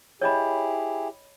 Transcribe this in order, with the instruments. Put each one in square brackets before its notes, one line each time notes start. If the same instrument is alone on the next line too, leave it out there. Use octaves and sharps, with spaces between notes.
[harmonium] E4 G4 G#4 [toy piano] C#5 D#5 B5